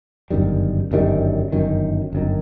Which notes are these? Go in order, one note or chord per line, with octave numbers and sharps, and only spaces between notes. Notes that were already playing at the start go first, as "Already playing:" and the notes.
G1 F#2 D#3 G3
G1 F#2 D#3 G3
G1 F#2 D#3
G1 F#2 D#3